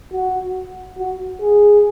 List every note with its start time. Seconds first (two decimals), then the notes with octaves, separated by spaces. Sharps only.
0.13 F#4
0.98 F#4
1.41 G#4